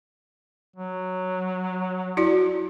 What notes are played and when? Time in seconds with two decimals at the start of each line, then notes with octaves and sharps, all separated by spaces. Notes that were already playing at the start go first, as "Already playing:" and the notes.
0.76 F#3
2.17 E4 F#4 D5